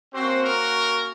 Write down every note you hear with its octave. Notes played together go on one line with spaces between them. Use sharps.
A#3 C4 C#4 F#4 C5
A#4